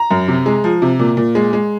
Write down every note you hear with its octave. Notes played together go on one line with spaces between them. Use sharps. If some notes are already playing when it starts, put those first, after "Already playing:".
Already playing: A#5
F#2
C3
G#3
F3
C3
A#2
A#2
G#3
G#3